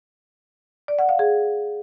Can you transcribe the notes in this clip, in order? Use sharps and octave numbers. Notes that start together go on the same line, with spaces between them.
D5
F#5
F5
G#4